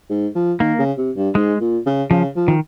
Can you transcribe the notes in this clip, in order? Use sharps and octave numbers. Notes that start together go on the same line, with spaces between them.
G#2
F3
D#3 A#3
C#3
C3
G2
G#2 G#3
A#2
C#3
C#3 F3
F3
D#3